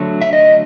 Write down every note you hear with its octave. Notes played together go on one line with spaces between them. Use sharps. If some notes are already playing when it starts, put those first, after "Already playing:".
Already playing: D3 F#3 A3
E5
D#5